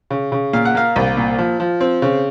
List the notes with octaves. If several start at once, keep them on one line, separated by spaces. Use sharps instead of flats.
C#3
C#3
A#2 F5
F#5
A#3 F5
C2
A#2
F3
F3
C4
C#3